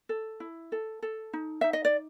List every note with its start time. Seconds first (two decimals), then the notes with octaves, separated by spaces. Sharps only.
0.09 A4
0.40 E4
0.72 A4
1.02 A4
1.33 D#4
1.61 D#4 E5
1.73 D#5
1.85 D5